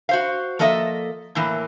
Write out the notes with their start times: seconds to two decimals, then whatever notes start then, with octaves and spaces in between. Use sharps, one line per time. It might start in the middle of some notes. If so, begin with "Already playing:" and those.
0.09 F#4 C5 F5
0.59 F3 A#3 A4 D#5 E5
1.35 A2 E3 A#3